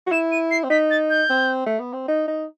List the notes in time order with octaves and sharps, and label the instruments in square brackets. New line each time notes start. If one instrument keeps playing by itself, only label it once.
[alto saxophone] F#4
[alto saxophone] E4 [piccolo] E7
[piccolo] D#7
C7
[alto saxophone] C4
[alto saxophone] D#4 [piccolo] B6
[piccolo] A6
G6
[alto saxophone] C4
A3
B3
C4
D#4
D#4